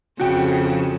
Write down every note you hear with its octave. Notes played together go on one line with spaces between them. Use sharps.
F2 C#3 F#4 G5